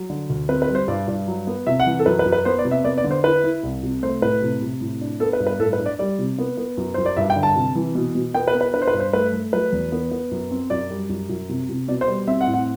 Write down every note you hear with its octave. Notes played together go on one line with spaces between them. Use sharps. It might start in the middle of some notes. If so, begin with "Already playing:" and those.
Already playing: F#3
D3
D2
C4 B4
B4
G3
C5
G2 D5
G2
F#3
B3
C3 E5
F#5
E3
A4
F#2 B4
B4
F#2
B4
B3 C5
D5
C3
E5
B3 D5
D5
D3
C5
E4 B4
E4
C2
C3
A3 C5
A2 B4
C3
C3
A2
D4
B3 A4
B4
G2
B4
A2 A4
B4
D4
D5
G3 D5
C3
B3
B3
F#2
F#2 C5
D5
G2 E5
G5
D3
A5
C3
E3
B2
B2
B3 G5
B4
B3
B4
D4 B4
C5
B4
G2
C5
A3 B4
A3
F#3 B4
E2
B3
B3
F#2
C4
F#2 D5
G3
F#2
F#2
C3
C3
B2 D5
C5
G3
C4 E5
F#5
A2
F#5